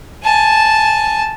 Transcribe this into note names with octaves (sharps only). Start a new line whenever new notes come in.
G#5 A5